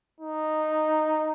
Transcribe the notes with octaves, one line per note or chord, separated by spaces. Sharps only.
D#4